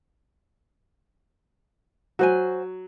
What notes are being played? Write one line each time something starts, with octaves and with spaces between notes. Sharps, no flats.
F#3 F#4 C5 G#5